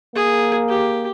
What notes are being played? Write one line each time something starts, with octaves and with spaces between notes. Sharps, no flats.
A#3 G#4
G4